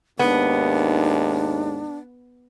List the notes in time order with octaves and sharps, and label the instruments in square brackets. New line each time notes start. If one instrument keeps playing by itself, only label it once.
[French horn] D#2 [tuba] G#2 [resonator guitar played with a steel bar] B3 [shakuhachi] D4